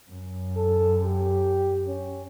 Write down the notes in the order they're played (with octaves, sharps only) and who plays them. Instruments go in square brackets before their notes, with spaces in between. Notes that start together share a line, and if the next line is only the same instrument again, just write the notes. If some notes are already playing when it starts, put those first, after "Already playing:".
[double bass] F#2
[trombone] A4
G4
C#4